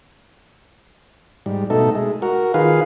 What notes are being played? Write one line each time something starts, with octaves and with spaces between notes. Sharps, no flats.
G#2 G3
B2 A3 D#4 A4
G#3
F#4 A#4
D#3 F4 G#4 B4 F5